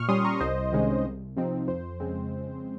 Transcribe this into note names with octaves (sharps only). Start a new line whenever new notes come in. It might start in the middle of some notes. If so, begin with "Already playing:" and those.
Already playing: A#2 C#6 F6
G3 C#4 C6 D#6
A#5 C#6
C2 C5 D#5
C3 D#3 G#3 C#4
C2
C3 F3 C4 D#4
F2 C5
C#3 G#3 C4